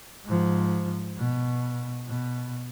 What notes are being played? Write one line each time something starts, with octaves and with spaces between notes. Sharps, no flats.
G#2 F3
B2
B2